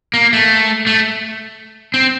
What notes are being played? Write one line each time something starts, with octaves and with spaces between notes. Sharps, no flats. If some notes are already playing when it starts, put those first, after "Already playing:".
A#3
A3
A3
C4